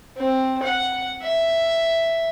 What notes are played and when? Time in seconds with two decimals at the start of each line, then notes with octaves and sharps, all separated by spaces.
0.18 C4
0.63 F#5
1.23 E5